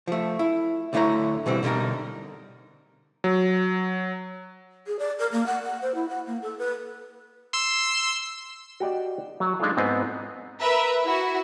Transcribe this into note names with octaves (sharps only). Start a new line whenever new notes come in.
F3 A3
E4
D2 D3 A3 E4 C#5 A#5
B2 D3 E3 G3 C4
B2 D3 G3 D#4 A#4
F#3
G#4
D5
A#4
A#3
F#5
F#5
C5
E4
F#5
A#3
A4
B4
C6 E6
F#4 G4 D5 D#5
F#3
G#3 D4 D#4 F4 A4 F5
G#2 B3 C4 D#5
A#4 B4 E5
E4 F#4